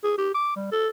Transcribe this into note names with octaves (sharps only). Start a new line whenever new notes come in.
G#4
G4
D6
G3
A4